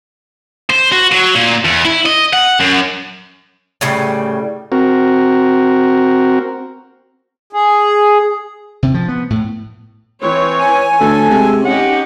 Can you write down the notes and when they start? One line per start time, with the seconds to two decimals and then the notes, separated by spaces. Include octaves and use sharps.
0.70 C5
0.92 F#4
1.12 F#3
1.35 A#2
1.65 E2
1.85 E4
2.06 D#5
2.33 F#5
2.60 F#2
3.81 A2 C#3 G3
4.72 C4 F#4 A#4
7.53 G#4
8.83 C3
8.94 F3
9.08 B3
9.30 A2
10.23 E3 C4 C#5
10.59 G#5
11.00 D2 A4
11.30 C3 G#3
11.65 C#4 D#4 G4 F#5